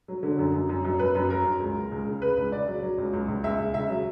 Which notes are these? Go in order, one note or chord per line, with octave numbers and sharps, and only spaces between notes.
F#3
D3
F#2
F#2
F#2
F#2
F#2 B4
F#2
F#3 A#4
F#2
C#2
C#2
C#2
C#3
C#3 B4
C#2
C#3 D5
F#3
F#3
C#2
C#2
C#2
C#2 E5
C#2
C#3 E5
F#3